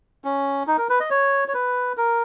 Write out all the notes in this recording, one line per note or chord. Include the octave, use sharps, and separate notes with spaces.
C#4
D#4
A#4
B4
D#5
C#5
C#5
B4
A#4